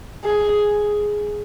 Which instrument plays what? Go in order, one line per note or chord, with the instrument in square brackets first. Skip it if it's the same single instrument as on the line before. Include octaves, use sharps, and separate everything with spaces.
[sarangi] G#4